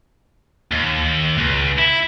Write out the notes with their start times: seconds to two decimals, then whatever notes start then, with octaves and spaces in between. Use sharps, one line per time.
0.71 D#2
1.38 C#2
1.78 E4